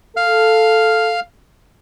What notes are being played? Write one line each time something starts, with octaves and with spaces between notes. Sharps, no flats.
A4 F5 F6